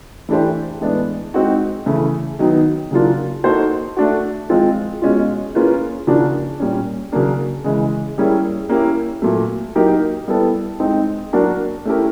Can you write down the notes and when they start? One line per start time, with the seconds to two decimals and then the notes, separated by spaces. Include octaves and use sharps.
0.29 E3 A3 D4 G4 C5
0.81 A2 E3 G#3 B3 D4
1.34 G#3 C4 D#4 F#4
1.86 C#3 E3 A3
2.39 D#3 F#3 B3 D#4
2.91 C#3 F#3 A#3 D4 F4
3.44 A#3 D#4 F#4 A4 C5
3.97 A3 D4 F#4
4.49 F3 G#3 C4 F4
5.02 B2 G#3 C#4 F4
5.54 A#3 C#4 F4 G#4 B4
6.07 C#3 F3 A#3 D4 F#4
6.60 A#2 G3 A#3 C#4
7.12 C#3 F#3 A#3 D4
7.64 C#3 E3 G#3
8.18 G3 A#3 C#4 E4 G#4
8.69 A#3 C#4 E4 G4
9.22 A#2 F#3 A3
9.76 F#3 A#3 D#4 G4 A#4
10.28 G3 B3 E4 A4
10.80 G#3 C4 D#4
11.33 F#3 A#3 D4 F#4 A#4
11.85 A3 C#4 E4 G4 A#4